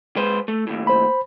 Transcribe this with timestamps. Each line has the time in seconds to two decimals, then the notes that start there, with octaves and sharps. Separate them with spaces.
0.16 G#3 B4 C5
0.48 A3
0.67 D#2 A2
0.87 C5 B5